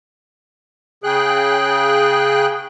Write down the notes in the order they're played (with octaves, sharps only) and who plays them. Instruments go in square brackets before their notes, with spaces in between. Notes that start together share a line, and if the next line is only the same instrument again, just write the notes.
[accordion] C#3 G#4 G5 F#6